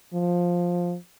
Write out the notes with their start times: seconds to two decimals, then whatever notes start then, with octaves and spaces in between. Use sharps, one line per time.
0.14 F3